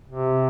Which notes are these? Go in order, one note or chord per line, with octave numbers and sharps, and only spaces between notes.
C3